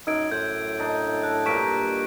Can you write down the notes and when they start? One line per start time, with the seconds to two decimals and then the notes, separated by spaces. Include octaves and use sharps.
0.07 F#2 D#4 E6 G#6 D7
0.31 A2 C5 F#5 G6 G#6
0.79 D4 D#4
1.23 A4 F#6
1.46 G2 A#2 A#4 C#6 B6 D7